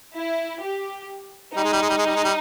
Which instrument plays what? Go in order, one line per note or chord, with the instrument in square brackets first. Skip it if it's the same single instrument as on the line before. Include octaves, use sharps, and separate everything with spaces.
[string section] E4
G4
[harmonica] G3 [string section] D#4
[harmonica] G#3
G3
G#3
G3
G#3
G3
G#3
G3